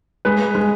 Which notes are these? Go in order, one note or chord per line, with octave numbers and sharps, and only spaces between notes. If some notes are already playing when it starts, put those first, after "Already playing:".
G#3 B4
G#3